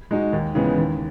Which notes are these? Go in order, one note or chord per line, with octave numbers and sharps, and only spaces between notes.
G#3 D#4 F#4
D#2
C#3 E3 G#3 B3
D#2